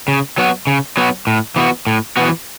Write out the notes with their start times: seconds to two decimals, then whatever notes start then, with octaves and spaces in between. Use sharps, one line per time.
0.08 C#3
0.38 F#3 B3 F#4
0.67 C#3
0.97 F#3 B3 F#4
1.27 A2
1.56 E3 B3 F#4
1.87 A2
2.17 E3 B3 F#4